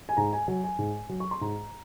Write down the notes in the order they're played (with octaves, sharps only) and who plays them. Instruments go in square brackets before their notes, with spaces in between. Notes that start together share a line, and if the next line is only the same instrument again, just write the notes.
[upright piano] G#5
G#2 A#5
G#5
F#3 G#5
G#5
G#2
F#3
C#6
C6
G#2 A#5